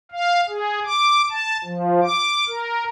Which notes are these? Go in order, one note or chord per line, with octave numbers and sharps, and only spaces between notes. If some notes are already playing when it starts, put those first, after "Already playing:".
F5
G#4
D6
A5
F3
D6
A#4